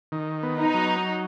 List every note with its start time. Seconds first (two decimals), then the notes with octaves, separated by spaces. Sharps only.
0.12 D#3
0.43 B3
0.59 D#4
0.74 F#3